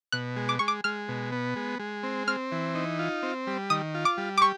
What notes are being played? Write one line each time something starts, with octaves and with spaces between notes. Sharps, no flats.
B2 F#6
G#3
D6
G#3 C#6
D6
G#3 F6
B2
B3
G#3
G#3
C4
C4 F6
E3
D#4
F4
C4
G3
D#3 D#6
F4
D6
G3
D6
G4 C#6